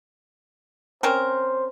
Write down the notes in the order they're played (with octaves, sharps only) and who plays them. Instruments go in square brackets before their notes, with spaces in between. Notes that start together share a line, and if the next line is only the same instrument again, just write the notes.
[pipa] C4 C#4 A#4 [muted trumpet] C5